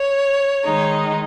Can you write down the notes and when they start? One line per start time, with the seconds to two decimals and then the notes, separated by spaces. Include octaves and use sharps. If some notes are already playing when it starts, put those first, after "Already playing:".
Already playing: C#5
0.64 D#3 G#3 D#4